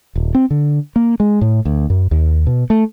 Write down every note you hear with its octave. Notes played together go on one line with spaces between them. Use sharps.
D#1
C4
D3
A#3
G#3
A2
D2
F#2
D#2
B2
A3